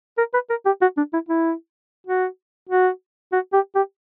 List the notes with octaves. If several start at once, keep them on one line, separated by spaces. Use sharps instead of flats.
A#4
B4
A#4
G4
F#4
D4
E4
E4
F#4
F#4
F#4
G4
G4